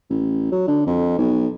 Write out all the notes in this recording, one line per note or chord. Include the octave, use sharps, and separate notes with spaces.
A1
F#3
D3
F2
B1